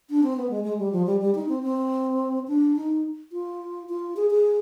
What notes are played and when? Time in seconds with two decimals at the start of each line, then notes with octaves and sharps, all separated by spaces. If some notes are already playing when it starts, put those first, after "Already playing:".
0.10 D4
0.23 C4
0.37 B3
0.50 G#3
0.64 G#3
0.78 G3
0.92 F3
1.06 G3
1.21 G3
1.35 D#4
1.49 C4
1.63 C4
2.48 D4
2.76 D#4
3.32 F4
3.89 F4
4.17 G#4
4.31 G#4